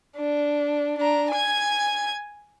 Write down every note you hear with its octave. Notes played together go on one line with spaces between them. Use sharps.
D4
D4 A#5
G#5 G#6